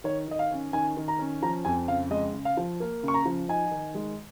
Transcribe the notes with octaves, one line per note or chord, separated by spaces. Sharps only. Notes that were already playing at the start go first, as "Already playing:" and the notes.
D#3 C#5
D#3 D#5
F5
C#4
D#3 G#5
D#3
A#5
C#4
F3 A#5
F2 G#5
C#3 F5
G#3 D#5
C#3
F5
F3
A#3
C#3 C#6
A#5
F3
D#4 G#5
D#3
G#3